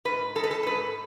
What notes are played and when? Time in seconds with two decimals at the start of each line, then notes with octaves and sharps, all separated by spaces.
0.05 G#2 B4
0.35 G#3 A4
0.44 B4
0.51 A4
0.63 A4
0.66 G#2 B4